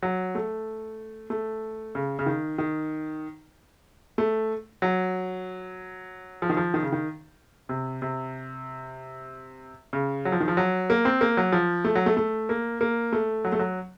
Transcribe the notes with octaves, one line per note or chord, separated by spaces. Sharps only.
F#3
A3
A3
C#3
C#3
D#3
D#3
A3
F#3
F3
D#3
F3
D#3
C#3
D#3
C3
C3
C#3
F#3
F3
D#3
F3
F#3
A#3
C4
A#3
F#3
F3
A3
F#3
A3
A3
A#3
A#3
A3
F#3
A3
F#3